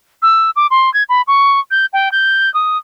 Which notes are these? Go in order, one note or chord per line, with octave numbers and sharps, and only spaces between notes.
E6
D6
C6
G#6
B5
C#6
G6
G5
G6
D#6